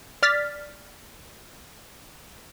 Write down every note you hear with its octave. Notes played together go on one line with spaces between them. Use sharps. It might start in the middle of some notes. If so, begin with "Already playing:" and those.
D5 F6 A6 B6